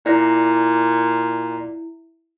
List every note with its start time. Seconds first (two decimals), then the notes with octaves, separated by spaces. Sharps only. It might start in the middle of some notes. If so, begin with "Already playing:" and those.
0.06 A#2 E4 D5 A#6